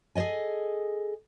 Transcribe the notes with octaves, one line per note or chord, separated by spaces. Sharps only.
G#4 A4 C#5 D#5 G#5